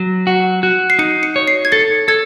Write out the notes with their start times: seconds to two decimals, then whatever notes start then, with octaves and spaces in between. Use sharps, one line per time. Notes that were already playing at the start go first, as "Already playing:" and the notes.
Already playing: F#3
0.27 F#4
0.63 F#4
0.90 C7
0.99 D#4 C#7
1.23 C#7
1.36 C#5
1.48 C7
1.65 G#6
1.72 A4 A6
2.08 A4 G#6